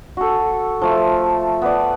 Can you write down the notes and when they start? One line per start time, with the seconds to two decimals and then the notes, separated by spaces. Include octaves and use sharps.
0.17 F#4 A4
0.82 F3 A3
1.62 B3 D5